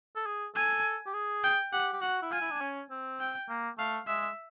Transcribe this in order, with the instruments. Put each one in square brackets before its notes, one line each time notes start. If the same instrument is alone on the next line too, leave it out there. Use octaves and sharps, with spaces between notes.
[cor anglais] A4
G#4
[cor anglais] A4 [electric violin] G#5
[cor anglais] G4
G#4
[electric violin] G5
[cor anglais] G4 [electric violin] F#5
[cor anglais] G4
[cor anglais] F#4 [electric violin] F#5
[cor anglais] E4
[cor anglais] F4 [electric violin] G#5
[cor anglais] E4
D4
C#4
C4
[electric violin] G5
[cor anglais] A#3
[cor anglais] A3 [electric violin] F5
[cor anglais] G#3 [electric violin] E5